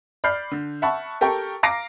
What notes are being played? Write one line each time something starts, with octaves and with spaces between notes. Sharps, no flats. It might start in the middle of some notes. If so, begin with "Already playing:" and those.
D5 B5 F6 G6 C7
D3
E5 F#5 A5 B5 C#6
G4 A4 A#4 G5 C#6
F5 A#5 D6 A#6 C7 D7